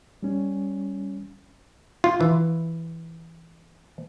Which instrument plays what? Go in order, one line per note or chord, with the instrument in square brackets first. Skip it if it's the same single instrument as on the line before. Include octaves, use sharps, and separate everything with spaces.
[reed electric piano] G3 C#4
[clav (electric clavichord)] F4
E3